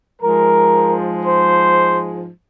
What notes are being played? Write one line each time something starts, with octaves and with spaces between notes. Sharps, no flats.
G#2 F3 G#3 A#4
C5